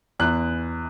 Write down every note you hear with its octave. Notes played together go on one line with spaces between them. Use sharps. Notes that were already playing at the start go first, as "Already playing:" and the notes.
E2 F#6